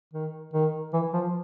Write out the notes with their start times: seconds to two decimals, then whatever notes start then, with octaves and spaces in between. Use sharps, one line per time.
0.14 D#3
0.53 D#3
0.93 E3
1.13 F3